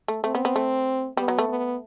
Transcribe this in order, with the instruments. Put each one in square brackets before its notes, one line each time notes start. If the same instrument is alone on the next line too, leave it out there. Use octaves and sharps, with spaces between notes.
[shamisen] A3
[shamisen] A3 [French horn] C4
[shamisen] B3
B3
A3
[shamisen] G3 [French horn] B3
[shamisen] F#3
A3
[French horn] B3